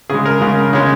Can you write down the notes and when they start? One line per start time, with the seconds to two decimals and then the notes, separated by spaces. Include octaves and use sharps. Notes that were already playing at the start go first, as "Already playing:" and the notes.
0.10 C#3 G#3 G#4
0.26 A#4
0.42 C#3 G#3
0.73 C#3 G#3 C#5